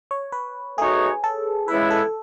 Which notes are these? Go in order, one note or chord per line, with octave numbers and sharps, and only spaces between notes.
C#5
B4
A3 D#4 F#4 G#4 C#5
A4
C#3 E3 G#3 B3 E4 B4
A4